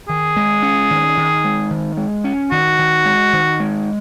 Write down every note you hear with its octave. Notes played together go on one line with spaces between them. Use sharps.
D#3 G#4
G#3
C#4
D#3
D#3
G#3
D#3
G#3
C#4
D#3 F#4
D#3
G#3
D#3
G#3